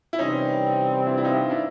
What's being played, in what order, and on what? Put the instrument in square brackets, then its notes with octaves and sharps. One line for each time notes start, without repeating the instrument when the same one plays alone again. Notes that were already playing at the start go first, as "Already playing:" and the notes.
[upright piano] E4
[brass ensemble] C3 E3 G3 C4 [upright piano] C#4 D#4
[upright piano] D4 E4
E4
D#4 F4
D4 E4
D4 E4